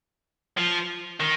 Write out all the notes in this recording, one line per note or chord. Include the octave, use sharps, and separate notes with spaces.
F3
D#3